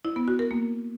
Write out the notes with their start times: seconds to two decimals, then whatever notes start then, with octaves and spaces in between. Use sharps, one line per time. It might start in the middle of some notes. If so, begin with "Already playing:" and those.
0.05 E4
0.16 B3
0.28 F#4
0.39 A#4
0.51 A#3